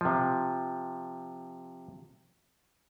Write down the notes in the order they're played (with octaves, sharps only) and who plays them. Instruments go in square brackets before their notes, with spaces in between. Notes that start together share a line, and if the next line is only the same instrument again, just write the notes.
[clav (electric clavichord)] C3 F3